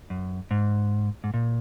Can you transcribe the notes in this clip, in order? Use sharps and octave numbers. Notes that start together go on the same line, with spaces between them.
F#2
G#2
G#2
A#2